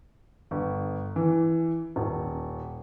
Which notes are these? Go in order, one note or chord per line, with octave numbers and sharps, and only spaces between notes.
G1
E3
D#1